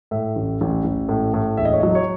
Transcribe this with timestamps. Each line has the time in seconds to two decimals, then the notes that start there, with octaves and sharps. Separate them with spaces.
0.11 A2 E5
0.36 A1
0.61 A1
0.84 A1
1.09 A2
1.34 A2
1.57 E1 E5
1.65 D#5
1.73 C#5
1.80 F#3 D#5
1.95 C#5